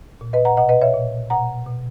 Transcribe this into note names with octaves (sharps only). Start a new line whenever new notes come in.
A#2
B4 D#5
F#5 A#5
B2 D#5 F#5
B4 D#5
C#5 E5
A#2
B2 F#5 A#5
B2